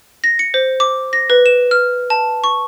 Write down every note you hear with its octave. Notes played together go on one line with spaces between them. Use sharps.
A#6
C#7
C5
D6
A#6
B4
E7
F6
A5
C#6